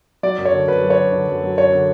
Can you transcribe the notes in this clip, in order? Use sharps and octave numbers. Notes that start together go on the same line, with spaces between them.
F#3 D5
F#2
C#5
D3
F#2 B4
F#3
C#5
F#2
D3
F#2
F#3
F#2 C#5
D3